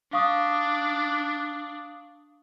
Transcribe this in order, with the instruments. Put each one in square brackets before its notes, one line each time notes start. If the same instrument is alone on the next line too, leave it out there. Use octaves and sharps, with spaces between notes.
[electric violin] D4 [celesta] F5 C#6 D#6